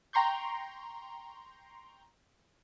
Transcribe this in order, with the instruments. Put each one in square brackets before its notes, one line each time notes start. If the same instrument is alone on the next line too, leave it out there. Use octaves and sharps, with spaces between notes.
[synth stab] G5 A#5 C6 C#6 G6